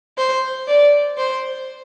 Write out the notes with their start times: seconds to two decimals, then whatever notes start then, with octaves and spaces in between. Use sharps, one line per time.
0.17 C5
0.67 D5
1.18 C5